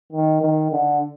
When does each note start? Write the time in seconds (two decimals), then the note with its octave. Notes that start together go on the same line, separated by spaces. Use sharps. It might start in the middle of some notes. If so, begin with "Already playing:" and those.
0.12 D#3
0.41 D#3
0.72 D3